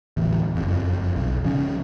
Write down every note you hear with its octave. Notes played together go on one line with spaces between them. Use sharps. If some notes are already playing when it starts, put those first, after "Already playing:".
D1 A1 E2
F#1 F2
B1
C#3 F3 C#4